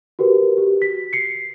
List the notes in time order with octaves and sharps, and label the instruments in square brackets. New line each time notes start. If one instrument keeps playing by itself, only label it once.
[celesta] F#4 G4 A#4 B4
F#4 G4
B6
C7 C#7